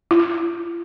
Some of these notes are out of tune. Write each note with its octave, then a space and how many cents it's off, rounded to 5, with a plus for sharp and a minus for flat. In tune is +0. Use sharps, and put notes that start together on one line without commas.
F4 -40